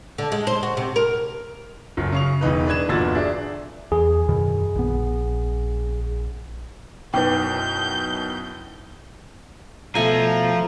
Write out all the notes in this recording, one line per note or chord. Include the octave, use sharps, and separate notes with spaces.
D3
G#3
C5
F#4
C3
A#4
F#1 F#2
C#3 C#6 F7
E1 E3 D#4 B4
D4 B4 D#5 G#6 E7
G1 E2 A#2 F#4 E6 A6
D4 G#4 E5
E2 G#4
F#2 B2 D#3
A#1 B3
F#2 B2 D#4 E4 B4 G5 G6
B2 F3 A3 F4 G#5 A#5